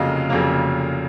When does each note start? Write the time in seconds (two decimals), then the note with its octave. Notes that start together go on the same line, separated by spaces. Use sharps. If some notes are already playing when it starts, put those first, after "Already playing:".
Already playing: F1 F2 C#3 F#3 A#3 D#5 F5
0.29 F1 F2 C#3 F#3 A#3 F5